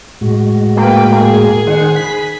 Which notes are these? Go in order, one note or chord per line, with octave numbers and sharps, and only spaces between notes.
A2 G#3 F#4
A#3 B4 G5
A#3 G#4
D#3 C5 F#5
B5 B6